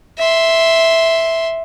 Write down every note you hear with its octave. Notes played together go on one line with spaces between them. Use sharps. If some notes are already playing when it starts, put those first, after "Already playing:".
E5 C6